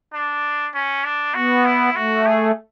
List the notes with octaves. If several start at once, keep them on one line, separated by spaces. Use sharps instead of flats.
D4
C#4
D4
B3 F#4
E4
A3 F#4
G#4